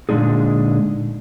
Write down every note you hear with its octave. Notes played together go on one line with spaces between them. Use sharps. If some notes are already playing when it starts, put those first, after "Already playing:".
A#2 D3 G#3 D4 D#4 G#4